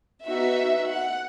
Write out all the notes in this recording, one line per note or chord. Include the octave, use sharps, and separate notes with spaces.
B3 D#4 F#4 E5
F#5